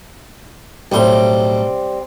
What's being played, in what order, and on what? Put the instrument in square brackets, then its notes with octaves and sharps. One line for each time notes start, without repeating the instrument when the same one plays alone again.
[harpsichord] B1 A2 C6 [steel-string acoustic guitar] G3 C4